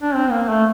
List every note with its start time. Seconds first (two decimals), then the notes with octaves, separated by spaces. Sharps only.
0.02 D4
0.15 C4
0.31 A#3
0.48 A3